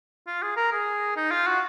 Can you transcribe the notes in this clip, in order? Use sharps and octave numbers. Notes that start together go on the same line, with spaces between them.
F4
G#4
A#4
G#4
D#4
F4
F#4